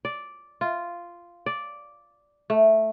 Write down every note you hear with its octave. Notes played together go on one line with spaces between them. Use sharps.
D5
F4
D5
A3